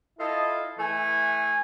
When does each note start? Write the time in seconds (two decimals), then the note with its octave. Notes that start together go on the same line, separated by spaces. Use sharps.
0.19 E4 F4 A4 D#5
0.78 E3 A3 G#5